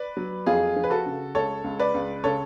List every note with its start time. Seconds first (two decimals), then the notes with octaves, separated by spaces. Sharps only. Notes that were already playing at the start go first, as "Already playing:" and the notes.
Already playing: B4 D5
0.17 F#3
0.46 F2 F4 G#4
0.76 F3
0.84 B4
0.90 F#4 A4
1.06 C#3
1.35 C#2 A4 C#5
1.64 C#2
1.79 B4 D5
1.94 C#2
2.24 C#3 A4 C#5